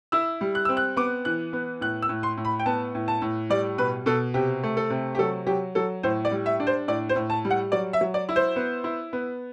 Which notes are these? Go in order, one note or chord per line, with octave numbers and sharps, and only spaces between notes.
E4 E6
G3
F#6
C4 E6
F#6
B3 D6
E3 F#6
B3
A2 F#6
E6
A2
C6
A2
B5
G5
B3 A5
A2
A5
A2
G3 D5
B2 B4
B2 A4
C3 G4
A3
A4
C3
G4
F#3 A4
F#3 G4
F#3 A4
A2 C5
D5
G3
E5
D4
C5
A2 D5
C5
A2
A5
G3
F#5
F#3 D5
E5
F#3
D5
E4
C5
B3
E4
B3